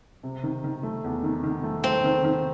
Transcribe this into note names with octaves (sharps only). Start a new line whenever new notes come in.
C3
D#3
D#3
A3
E2
D#3
D#3
A3
A3 C4
D#3
D#3